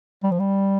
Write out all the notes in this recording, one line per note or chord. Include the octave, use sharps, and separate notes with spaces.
G3
F3
G3